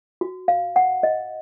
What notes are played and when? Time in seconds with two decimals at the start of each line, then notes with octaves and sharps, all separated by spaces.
0.21 F#4
0.48 F5
0.76 F#5
1.03 D#5